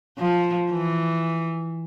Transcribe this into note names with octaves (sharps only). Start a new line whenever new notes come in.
F3
E3